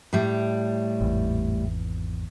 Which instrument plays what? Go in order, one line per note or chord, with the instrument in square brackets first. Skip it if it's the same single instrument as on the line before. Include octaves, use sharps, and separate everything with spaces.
[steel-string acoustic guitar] A2 G3
[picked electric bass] G#1 E2